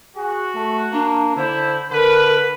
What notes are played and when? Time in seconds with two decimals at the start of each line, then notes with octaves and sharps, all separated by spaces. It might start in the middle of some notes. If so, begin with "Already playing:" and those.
0.16 F#4 G#4
0.55 A3
0.93 A#3 D4
1.37 D3 E4 C5
1.91 D3 A#4 B4